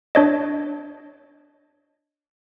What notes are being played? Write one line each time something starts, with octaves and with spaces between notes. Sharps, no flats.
D4 C#5 D#5